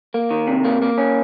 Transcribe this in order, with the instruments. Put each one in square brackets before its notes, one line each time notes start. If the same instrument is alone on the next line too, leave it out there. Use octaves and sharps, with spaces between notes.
[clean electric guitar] A#3
D#3
C3
A#3
A#3
C#4